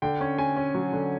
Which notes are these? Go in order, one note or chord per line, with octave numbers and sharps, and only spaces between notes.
D3 G5
C#4
C#4 G#5
C#4
F#3
D3